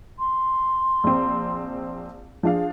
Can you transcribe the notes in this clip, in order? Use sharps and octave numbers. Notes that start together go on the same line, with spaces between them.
C6
A#1 C4
F3 D4 G#4 F5